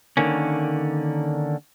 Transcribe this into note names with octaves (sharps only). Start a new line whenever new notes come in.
D3 D#3 A#3 C#4